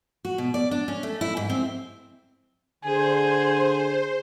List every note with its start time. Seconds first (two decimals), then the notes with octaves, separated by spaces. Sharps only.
0.25 F#4
0.38 B2
0.54 D5
0.71 D4
0.88 C#4
1.03 A3
1.21 E4
1.37 G#2
1.50 C4
2.84 D3 G#4 C5 G#5